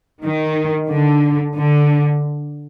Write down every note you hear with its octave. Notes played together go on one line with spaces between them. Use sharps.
D#3
D3
D3